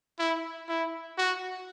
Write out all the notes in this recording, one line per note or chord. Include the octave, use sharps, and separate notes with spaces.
E4
E4
F#4